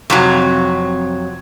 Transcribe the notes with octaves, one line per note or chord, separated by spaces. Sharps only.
F2 C3 F#3